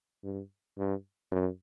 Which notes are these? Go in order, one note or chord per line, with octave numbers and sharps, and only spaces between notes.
G2
G2
F#2